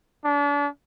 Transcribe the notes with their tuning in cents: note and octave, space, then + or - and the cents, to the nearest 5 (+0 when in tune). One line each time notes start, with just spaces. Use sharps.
D4 -35